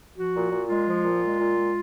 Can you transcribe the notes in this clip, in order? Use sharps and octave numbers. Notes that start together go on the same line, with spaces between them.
F3 F#4
A#2
A#2
G#3 F4
F3
A#2
G#3
A#2
G#3